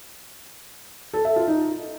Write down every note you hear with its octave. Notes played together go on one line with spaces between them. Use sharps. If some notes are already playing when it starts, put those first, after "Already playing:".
A4
E5
F4
D#4